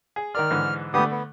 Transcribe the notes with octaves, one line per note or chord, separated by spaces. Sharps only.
G#4
D#3 A#4 D5 F6
G#2 D3 E3
D3 A3 B3 G4 D#6
B3